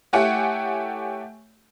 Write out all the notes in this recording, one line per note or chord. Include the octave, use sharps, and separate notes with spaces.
A3 E4 G4 C#5 F#5 G#5